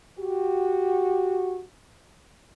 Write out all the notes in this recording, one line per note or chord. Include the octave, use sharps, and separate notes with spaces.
F#4 G4